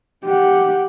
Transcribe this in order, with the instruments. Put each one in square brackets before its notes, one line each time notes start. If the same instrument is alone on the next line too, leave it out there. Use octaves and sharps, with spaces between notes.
[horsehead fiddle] G4 F#5